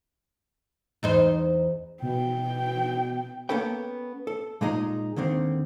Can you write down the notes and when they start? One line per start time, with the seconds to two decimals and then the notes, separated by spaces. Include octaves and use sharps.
1.03 E2 D#4 C5
2.02 B2 G5
3.49 A#3 B3 C#4 A4 B4 G5
4.27 A4
4.61 A#2 G#3 D#4 G#4 D#5 A#5
5.16 D#2 D3 D#3 C4